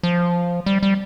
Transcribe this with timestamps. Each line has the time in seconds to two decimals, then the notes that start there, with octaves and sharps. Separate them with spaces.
0.03 F3
0.66 G3
0.83 G3